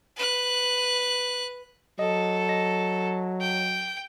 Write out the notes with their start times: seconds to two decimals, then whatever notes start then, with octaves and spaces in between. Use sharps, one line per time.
0.16 B4 F#6
1.99 F#3 A4 D#5
2.49 D#5 A#6
3.41 G5